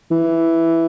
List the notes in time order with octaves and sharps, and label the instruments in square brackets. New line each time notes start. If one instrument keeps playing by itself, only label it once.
[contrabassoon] E3